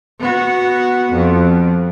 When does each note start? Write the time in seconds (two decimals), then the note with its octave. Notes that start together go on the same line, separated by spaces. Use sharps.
0.20 B3 F#4
1.13 F2